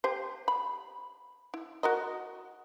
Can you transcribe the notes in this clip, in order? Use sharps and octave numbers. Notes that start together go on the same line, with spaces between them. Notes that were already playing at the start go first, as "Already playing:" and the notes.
G4 C5
B5
E4
F#4 A#4 D#5